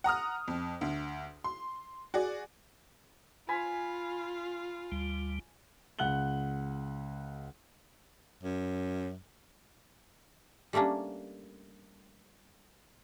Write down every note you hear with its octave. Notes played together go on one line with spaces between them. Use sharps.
F#5 A#5 D#6 F6
F2
D2
C6
F#4 G#4 D5
F4 G#5 B5
D2 G3
C#2 F#5 F#6 F#7 G7
F#2
G3 A3 A#3 C#4 D4